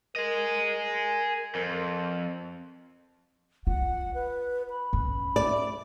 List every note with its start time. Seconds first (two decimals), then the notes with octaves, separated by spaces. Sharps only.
0.16 G#4 A#4 D#5
1.55 F2
3.67 F4 F#5
4.14 B4
4.70 B5
4.93 C#4
5.36 D5